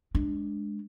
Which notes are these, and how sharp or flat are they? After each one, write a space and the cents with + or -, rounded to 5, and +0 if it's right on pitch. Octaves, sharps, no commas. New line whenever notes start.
G#3 +0 D4 +0